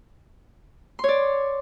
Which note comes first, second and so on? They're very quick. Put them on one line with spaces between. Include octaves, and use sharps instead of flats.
C6 C#5 D5